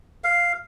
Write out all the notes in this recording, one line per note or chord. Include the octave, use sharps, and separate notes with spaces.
F5